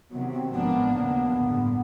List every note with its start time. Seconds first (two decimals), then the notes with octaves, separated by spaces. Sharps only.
0.11 C3 D#3 F#3 B3
0.31 C4
0.52 A1 G#2 F3 A#3 B3 D4
0.93 D#2 C#3 F#3 A#3 D4
1.34 A1 G2 D3